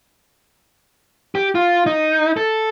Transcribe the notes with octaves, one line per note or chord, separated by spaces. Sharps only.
G4
F4
D#4
A4